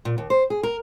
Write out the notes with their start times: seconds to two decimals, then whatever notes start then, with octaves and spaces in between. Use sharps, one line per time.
0.05 A#2
0.18 D#2
0.30 C5
0.50 G#4
0.63 A#4